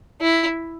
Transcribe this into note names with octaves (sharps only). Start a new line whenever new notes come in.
E4